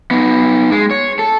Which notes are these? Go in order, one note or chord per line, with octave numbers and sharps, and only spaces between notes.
B3 D#4
G#3
C#5
A4